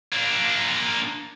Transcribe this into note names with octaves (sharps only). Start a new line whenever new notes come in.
A#3 D4